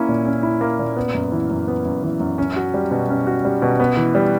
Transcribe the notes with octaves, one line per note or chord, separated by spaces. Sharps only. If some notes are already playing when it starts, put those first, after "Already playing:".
Already playing: A#3 C#4 E4
A#2
C#4
E4
A#3
A#2
B3
F#2
E3
F#2
B3
F#2
E3
F#2
C#4
F#4
G3
B2
C#4
F#4
G3
B2
B3
E3
G3